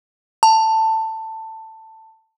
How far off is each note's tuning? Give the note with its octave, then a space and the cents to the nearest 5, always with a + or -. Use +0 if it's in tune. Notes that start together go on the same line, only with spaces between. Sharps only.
A5 +15